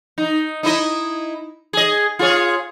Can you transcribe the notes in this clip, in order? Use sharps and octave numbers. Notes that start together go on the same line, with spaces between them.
D#4
D#4 E4 D#5
G#4 D#5
F4 G#4 C#5